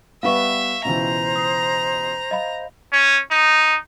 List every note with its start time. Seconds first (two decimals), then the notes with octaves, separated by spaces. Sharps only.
0.23 G3 B3 B4 E5 F5 C#6
0.85 C#2 B2 E3 C5 A#5
1.36 D#6 C7
2.31 D#5 F5 B5
2.93 C#4
3.31 D#4